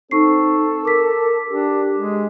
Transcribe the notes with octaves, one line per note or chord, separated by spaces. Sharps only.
C4 D#4 A4 C#6 C7
A#4 D6 B6
D4 G4
G#3